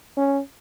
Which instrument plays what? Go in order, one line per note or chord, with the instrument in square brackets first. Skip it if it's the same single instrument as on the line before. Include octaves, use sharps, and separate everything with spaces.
[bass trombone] C#4